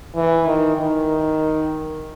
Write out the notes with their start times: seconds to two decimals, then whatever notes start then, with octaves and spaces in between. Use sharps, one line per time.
0.16 E3
0.47 D#3
0.77 D#3